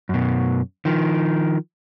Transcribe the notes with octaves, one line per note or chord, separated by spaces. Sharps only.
F#2 B2
D#3 F3